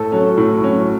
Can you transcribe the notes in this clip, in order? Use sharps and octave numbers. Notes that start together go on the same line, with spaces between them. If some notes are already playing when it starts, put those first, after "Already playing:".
Already playing: A2 A4 A5
F#3 C#4
A2
F#3 C#4